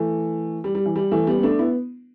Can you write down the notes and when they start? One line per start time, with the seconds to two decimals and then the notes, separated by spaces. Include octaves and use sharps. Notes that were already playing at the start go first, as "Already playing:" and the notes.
Already playing: E3 A3
0.64 G3
0.75 G3
0.86 E3
0.96 G3
1.12 E3 A3
1.27 G3 B3
1.39 B3
1.43 A3 D4
1.59 B3 E4